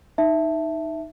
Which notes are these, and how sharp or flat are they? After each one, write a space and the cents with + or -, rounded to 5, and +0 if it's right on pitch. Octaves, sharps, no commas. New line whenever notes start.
D#4 +0 E5 +0 A5 +0